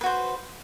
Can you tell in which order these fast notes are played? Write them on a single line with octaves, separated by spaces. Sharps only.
B4 F#4 C5